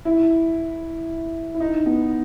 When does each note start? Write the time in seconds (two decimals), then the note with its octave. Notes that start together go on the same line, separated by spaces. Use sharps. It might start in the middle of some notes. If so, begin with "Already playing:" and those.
0.05 E4
1.54 E4
1.60 D#4
1.86 B3